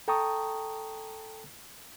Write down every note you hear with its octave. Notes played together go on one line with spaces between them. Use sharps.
A4 G5 A5 A#5 C#6 D#6